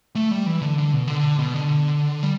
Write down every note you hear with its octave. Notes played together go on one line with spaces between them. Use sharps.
A3
G3
E3
D3
D3
B2
D3
B2
D3
G3